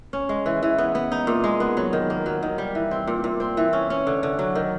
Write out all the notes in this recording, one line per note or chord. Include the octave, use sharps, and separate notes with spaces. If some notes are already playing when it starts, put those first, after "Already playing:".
C#4
G#3
E3
E3
B3
B3
D#4
A#2
G#3
B3
F#3
D#3
A#3
F#3
D#3
G3
E3
C4
A#2
A#2
C4
E3
C#4
C#4
D3
D3
F#3
D#3